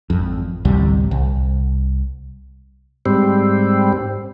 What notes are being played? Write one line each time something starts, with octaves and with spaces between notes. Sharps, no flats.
G#1 F2
A1 D2 C3 G3
C2
G#2 G3 C4